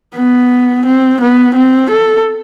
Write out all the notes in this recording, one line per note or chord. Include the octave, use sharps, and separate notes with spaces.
B3
C4
B3
C4
A4